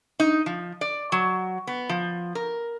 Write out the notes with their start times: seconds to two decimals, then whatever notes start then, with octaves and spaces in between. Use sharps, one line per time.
0.20 D#4
0.46 F3
0.81 D5
1.12 F#3
1.67 B3
1.89 F3
2.35 A#4